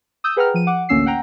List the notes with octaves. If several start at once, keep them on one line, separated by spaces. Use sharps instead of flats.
D#6 E6 G6
G#4 B4 F#5 G5 A#5 F6
F3 D#7
F#5 D6
A1 D2 A#3 C#4 E6 C7
F#5 G5 A#5